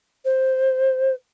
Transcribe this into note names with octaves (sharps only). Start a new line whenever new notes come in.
C5